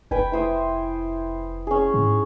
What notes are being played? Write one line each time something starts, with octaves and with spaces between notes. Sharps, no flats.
F1 B4 G5 G#5
E4 C5 D#6
C#4 G#4
G#2